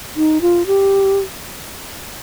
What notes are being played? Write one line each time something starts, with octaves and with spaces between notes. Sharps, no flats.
D#4
F4
G4